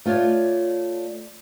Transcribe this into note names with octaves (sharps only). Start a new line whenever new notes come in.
A3 F4 C#5 D5